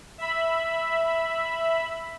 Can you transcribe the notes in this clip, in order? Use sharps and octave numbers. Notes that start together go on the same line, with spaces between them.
E5 B5